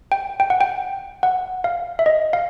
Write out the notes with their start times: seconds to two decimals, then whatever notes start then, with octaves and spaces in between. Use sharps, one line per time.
0.12 G5
0.40 G5
0.50 F#5
0.61 G5
1.23 F#5
1.64 F5
1.99 E5
2.06 D#5
2.33 F5